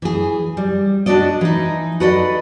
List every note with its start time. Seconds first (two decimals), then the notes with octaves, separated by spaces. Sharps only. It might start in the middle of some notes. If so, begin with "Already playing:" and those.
0.02 E3 G#4
0.57 G3
1.06 D4 F#4 G4 A4 D5 D#5
1.41 E3 D#4
2.00 F#4 A4 B4 D5 D#5